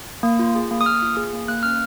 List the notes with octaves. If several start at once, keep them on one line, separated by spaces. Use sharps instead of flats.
A#3
F4
G#4
A#3
D#6
A#3 F6
F4
G#4
A#3
A#3 F#6
C#4 F6